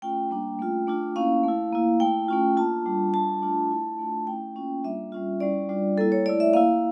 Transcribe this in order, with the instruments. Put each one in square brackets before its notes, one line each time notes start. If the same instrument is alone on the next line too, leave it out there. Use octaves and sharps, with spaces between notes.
[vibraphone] A3 C#4 F4 G5
G3 A#3 D4
A3 C#4 F4
A3 D4 F4
A#3 C#4 E4 F5
A3 E4
A#3 E4
A3 E4 G5
A3 C#4 F4
A#3 D4 F4 A5
G3 D4 F4
G3 D4 F4 A5
A3 D4 F4
A3 E4
A3 D4 F4
A3 C#4 E4 G5
A#3 C#4 F4
G3 A#3 D4 F4 E5
G3 C#4 F4
G3 C#4 E4 D5
G3 D4 F4
G3 A#3 E4 A4
C#5
A3 E4 D5
E5
A#3 E4 F5